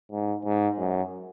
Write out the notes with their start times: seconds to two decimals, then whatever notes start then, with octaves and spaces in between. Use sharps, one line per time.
0.12 G#2
0.44 G#2
0.79 F#2